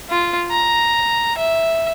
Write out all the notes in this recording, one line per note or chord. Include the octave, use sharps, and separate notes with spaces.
F4
A#5
E5